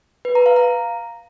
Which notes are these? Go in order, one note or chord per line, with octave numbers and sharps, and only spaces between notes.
B4
A#5
F5
A#5